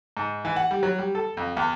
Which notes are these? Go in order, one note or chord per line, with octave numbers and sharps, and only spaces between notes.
G#2
E3
F#5
G3
F#3
G3
A4
F2
E2